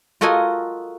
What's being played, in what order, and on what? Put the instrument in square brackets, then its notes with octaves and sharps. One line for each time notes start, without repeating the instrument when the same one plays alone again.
[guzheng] F4 F#4 A4 A#4 D#5 G#5